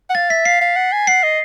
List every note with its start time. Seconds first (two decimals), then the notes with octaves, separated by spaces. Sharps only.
0.10 F#5
0.15 F5 A6
0.30 E5 B6
0.45 F5 C7
0.61 F5
0.76 F#5
0.92 G#5
1.07 F#5 C7
1.23 D#5